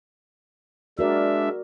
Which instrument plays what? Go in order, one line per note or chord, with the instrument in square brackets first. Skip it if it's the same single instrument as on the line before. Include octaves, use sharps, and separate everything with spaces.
[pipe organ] G#3 D4 E5 [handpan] F#4 A#4 D5